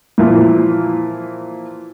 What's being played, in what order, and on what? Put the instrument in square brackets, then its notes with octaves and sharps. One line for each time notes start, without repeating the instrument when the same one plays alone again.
[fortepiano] A#2 E3 F3